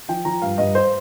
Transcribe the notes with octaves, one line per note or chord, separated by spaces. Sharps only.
F3 G5
F3 A#5
G2 F5
G2 D#5
C5